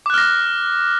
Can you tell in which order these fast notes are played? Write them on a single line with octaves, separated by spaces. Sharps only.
D6 F#6 F6 A#6